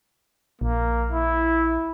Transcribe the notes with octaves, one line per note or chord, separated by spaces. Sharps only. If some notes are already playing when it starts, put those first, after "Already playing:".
A#1 A#3
E4